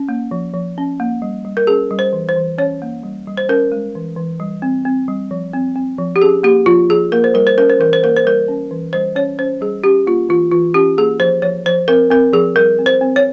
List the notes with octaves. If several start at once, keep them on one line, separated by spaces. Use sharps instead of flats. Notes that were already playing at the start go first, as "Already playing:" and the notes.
Already playing: C#4
A#3
F3
F3
C#4
A#3
G3
G3
A#4
C#4 G#4
G3
C5
E3
C5
E3
C#4 C#5
A#3
G3
G3
C5
C#4 A#4
G#3
E3
E3
G3
C4
C4
G3
F3
C4
C4
F3
G4
C#4 G#4
A#3 G4
F3 F4
F3 G#4
A#3 A#4
C5
G3 A#4
C5
C#4 A#4
C5
E3 A#4
C5
A#3 A#4
C5
G3 A#4
C#4
E3
G3 C5
C#4 C#5
C#4 C5
G3 G#4
C#4 G4
A#3 F4
E3 F4
E3 F4
C#4 G4
A#3 G#4
F3 C5
F3 C#5
F3 C5
C4 A#4
C4 A#4
F3 G#4
G3 A#4
C4
C5
C4
C#5